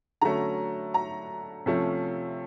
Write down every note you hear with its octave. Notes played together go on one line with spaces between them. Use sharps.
D3 F#3 A3 C#4 A#5
A#5
C3 F3 A3 C#4